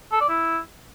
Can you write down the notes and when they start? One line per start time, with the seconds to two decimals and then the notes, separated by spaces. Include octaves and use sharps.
0.12 A4
0.21 D5
0.29 E4